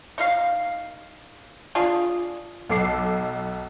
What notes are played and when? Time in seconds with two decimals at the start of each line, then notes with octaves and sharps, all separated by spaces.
0.18 D#4 A#4 F5
1.75 D4 F4 G#4
2.69 B1 A4 D6 C7